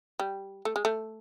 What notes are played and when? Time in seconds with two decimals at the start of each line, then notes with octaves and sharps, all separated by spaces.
0.19 G3
0.65 A3
0.76 G#3
0.85 A3